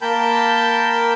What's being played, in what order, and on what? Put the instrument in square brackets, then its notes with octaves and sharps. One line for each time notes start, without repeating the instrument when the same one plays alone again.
[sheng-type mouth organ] A#3 A#4 G5 A5 B5 G6